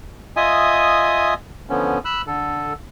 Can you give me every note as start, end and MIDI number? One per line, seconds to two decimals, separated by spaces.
0.37 1.34 65
0.37 1.34 75
0.37 1.34 76
0.37 1.34 80
0.37 1.34 87
1.70 1.99 50
1.70 1.99 53
1.70 1.99 59
1.70 1.99 61
2.05 2.22 83
2.05 2.22 88
2.05 2.22 90
2.27 2.73 50
2.27 2.73 69